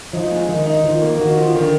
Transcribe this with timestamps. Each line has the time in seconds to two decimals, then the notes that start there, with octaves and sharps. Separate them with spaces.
0.13 F3 D#4
0.31 G#3
0.49 D#3 D#4
0.66 D#4
0.84 D#3 F3
1.02 A#3
1.20 D#3 F#4
1.37 F3
1.54 D3 D#3